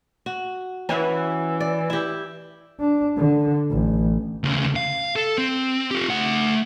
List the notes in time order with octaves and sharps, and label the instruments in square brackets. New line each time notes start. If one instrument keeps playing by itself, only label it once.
[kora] F#4
[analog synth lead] E3 [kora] C#4 E4 F#4
[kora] D5
E4 G4
[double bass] D4
D3
A1
[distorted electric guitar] D2 C#3
F5
A4
C4
F4 G4
A3 F#5